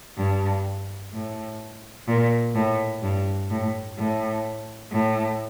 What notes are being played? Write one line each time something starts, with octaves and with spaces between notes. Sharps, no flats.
G2
A2
A#2
A2
G2
A2
A2
A2